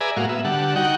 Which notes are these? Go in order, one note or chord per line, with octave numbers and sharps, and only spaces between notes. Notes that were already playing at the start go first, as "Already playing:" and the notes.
G#4 B4 D5 E5 G#5 A#5
A2 G#3 A#3 F#4 F5
B3 E5
D3 G3 F#5 A5
D#4 F#4 F#5 G5